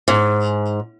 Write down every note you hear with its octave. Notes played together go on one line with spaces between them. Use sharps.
G#2